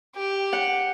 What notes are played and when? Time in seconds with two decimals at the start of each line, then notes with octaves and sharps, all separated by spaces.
0.16 G4
0.53 F#5